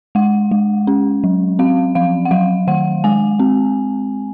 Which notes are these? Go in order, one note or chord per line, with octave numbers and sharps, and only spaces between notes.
G#3 F#5
G#3
C#4
F#3
C4 F5
F3 F5
F#5
F#3 F5
D#3 F#5
G#3 G#5
C4